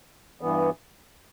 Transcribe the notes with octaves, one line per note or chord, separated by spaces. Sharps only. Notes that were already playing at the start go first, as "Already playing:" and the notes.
G2 E3 B3